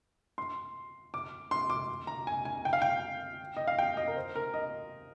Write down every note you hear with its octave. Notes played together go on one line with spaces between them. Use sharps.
C6
D6
C6
D6
A#5
G#5
G#5
G5
F5
G5
D#5
F5
G5
D#5
A#4
C5
A#4
D#5